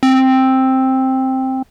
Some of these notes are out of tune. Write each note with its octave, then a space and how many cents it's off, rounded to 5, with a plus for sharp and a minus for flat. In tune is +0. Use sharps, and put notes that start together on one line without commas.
C4 +5